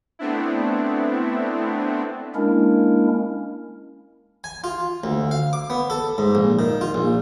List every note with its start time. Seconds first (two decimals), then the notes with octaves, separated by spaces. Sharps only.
0.19 A3 B3 C4 D4 E4
2.35 G#3 A#3 C#4 D4 E4 A#4
4.44 G#5
4.64 F4
5.04 D2
5.31 F5
5.53 D6
5.70 B3
5.90 A4
6.18 G#2
6.35 A#1
6.59 D#3
6.81 F4
6.94 A#1